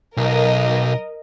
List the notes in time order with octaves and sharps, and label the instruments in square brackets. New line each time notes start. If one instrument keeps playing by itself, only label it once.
[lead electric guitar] B1 [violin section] A#4 D#5